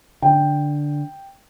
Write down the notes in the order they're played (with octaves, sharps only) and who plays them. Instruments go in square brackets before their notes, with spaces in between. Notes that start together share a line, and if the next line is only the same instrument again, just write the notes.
[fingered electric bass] D3 [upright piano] G5